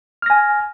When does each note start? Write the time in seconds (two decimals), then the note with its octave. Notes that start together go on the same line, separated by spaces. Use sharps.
0.22 F6
0.26 A#6
0.30 G#5